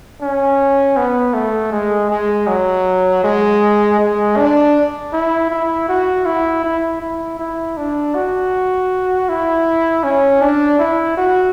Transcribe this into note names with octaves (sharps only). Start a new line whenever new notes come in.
C#4
B3
A3
G#3
G#3
F#3
G#3
G#3
D4
E4
E4
F#4
E4
E4
E4
E4
D4
F#4
E4
C#4
D4
E4
F#4